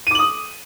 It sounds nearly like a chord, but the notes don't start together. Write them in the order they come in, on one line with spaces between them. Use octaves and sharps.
D#7 D6 F#7 D#6